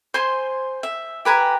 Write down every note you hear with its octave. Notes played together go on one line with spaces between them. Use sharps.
C5 G#5 C6
E5
G4 B4 G#5 A#5